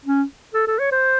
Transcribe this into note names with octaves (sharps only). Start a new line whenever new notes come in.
C#4
A4
A4
C#5
C5